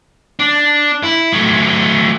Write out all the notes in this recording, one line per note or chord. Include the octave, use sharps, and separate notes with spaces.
D4
E4
F#3 A3